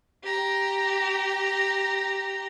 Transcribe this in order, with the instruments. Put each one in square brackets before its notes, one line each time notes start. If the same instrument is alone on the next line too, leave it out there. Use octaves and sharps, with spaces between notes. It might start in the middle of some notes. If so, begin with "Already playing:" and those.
[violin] G4 A#5